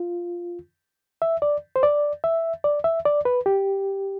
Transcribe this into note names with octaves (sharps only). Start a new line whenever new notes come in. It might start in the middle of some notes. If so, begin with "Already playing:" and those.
Already playing: F4
E5
D5
C5
D5
E5
D5
E5
D5
B4
G4